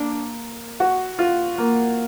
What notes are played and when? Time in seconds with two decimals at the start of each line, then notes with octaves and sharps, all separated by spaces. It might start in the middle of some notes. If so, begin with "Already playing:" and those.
Already playing: A#3 D4
0.80 F#4
1.19 F4
1.58 A#3